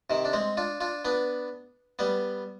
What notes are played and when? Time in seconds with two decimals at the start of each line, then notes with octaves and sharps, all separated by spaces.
0.10 C3 D#3
0.25 D4
0.33 G#3 C4
0.57 D4 F4
0.81 D4 F4
1.05 B3 D4
1.99 G3 B3